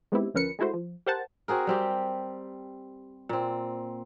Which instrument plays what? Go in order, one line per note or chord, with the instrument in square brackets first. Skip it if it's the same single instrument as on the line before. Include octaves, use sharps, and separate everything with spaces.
[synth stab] G#3 B3 C4 D#4 E4 G4
D2 F3 C#4 A#4 B4 C#7
G#3 A3 E4 F#4 C5
F3
G4 A#4 C5 F#5 A5
[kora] C4 F#4 G#4 A#4
G3 C4 G4
A#2 C4